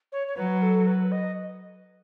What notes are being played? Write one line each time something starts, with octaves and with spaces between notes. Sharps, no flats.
C#5
C#5
F#3 B4
A4
B4
D#5